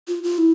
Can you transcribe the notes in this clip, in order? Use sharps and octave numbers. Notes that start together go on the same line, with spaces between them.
F4
F4
E4